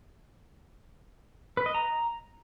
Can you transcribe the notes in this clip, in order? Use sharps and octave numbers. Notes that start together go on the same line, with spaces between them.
B4
D#5
A#5